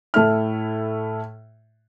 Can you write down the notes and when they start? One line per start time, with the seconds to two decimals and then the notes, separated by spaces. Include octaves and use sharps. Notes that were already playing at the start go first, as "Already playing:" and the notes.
0.14 A2 A3 E4 F6